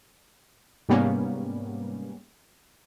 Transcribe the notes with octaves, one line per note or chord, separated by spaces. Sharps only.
G#2 C3 G3 A#3 B3 C#4